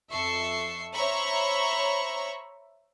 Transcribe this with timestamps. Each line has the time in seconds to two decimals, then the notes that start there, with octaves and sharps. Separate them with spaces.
0.11 F2 A4 E5 C#6 C7
0.93 C5 C#5 E5 A#5 B5 C#6